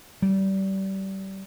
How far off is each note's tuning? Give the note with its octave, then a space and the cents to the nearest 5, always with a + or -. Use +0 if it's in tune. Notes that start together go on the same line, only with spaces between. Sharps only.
G3 -25